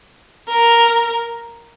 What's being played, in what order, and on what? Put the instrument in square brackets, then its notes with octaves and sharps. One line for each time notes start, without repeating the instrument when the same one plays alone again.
[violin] A#4